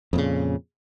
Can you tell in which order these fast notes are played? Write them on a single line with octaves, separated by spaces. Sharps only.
F2 A#2 C#3